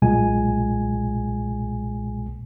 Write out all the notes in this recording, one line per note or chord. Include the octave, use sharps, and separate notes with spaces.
B1 A#2 G#3 G#5